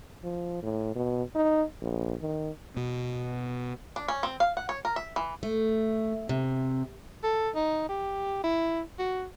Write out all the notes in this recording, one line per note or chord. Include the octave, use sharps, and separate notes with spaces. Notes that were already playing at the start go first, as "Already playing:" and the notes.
F3
A2
B2
D#4
A#1
D#3
B2
D4
C#4
C4
F5
F#5
C#5
A#4
E5
E3
A3
C3
A4
D#4
G4
E4
F#4